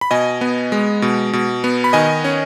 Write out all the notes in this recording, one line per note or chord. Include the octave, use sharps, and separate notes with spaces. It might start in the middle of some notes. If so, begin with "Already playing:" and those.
B5
B2 D#5 G#5
B3
G#3
B2
B2
B3
B5
D#3 D#5 G#5
C#4